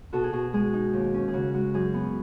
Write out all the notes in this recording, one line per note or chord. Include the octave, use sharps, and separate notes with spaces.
B2 F#4 A4
G#4
B2 F#4
G#3 G#4
D#4
D#2
C#4
G#4
C#3 F#4
G#3 F#4
F#2 G#4
B3